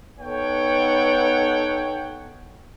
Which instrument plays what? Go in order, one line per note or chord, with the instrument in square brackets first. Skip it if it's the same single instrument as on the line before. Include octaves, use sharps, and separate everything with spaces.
[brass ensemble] B3 D#4 A4 C#5 F#5 G5